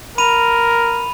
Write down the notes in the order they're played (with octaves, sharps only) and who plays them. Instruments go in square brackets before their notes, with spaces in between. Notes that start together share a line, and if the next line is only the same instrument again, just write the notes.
[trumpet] A#4 [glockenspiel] B5 D#7 F7